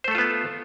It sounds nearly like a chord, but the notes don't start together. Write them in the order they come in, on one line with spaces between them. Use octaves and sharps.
C5 A3 A4 F4 B3